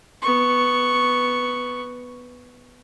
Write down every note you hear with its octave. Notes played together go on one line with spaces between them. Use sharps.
B3 C#6